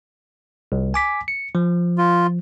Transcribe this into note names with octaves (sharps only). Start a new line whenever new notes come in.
C2
G#5 D6 B6
C#7
F3
F4